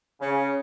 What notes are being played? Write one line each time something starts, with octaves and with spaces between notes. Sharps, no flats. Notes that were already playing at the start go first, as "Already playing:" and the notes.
C#3